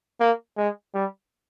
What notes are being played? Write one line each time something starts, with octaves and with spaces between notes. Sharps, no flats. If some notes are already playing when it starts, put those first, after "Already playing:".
A#3
G#3
G3